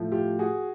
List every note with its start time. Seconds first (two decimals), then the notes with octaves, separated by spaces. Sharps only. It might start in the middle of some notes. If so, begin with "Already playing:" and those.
Already playing: A2 F3 A3
0.12 F4 G4
0.39 F#4 G#4